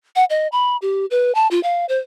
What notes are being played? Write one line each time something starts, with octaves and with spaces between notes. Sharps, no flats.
F#5
D#5
B5
G4
B4
A5
F4
F5
C5